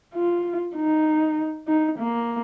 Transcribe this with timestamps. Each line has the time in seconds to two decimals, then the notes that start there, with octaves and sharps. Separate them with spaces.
0.14 F4
0.75 D#4
1.67 D#4
1.98 A#3